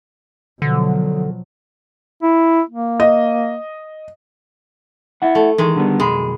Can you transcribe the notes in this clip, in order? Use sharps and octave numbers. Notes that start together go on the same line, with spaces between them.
B2 D3 F3 F#3
E4
A#3
D#5
E4 F#5
A3
D#3 E3 G#3
D3 G3 B3
B1 F2 G#3 B5